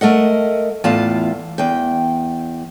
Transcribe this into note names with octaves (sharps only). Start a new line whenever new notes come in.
A3 A#4 D#5 F#5
E2 A2 F4 F5 A5
E2 G5